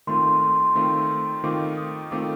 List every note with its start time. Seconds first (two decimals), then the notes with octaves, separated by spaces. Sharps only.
0.07 D#3 A3 C4 F4 C6
0.42 C6
0.75 D#3 A3 C4 F4
1.44 D#3 A3 C4 F4 D6
1.77 D#6
2.11 D#3 A3 C4 F4 D6